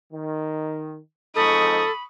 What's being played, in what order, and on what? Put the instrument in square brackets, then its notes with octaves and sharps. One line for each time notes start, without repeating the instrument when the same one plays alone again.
[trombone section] D#3
[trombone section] F2 G#3 D#4 [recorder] A4 [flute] B5 [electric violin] C#6 D#6